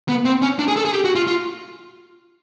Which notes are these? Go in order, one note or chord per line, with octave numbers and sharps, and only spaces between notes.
B3
C4
C#4
D4
G#4
A4
G#4
G4
F#4
F4
F4